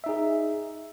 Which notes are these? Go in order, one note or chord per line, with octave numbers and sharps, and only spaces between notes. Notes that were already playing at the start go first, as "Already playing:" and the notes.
D#4 G#4 E5